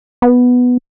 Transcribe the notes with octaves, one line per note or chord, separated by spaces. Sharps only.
B3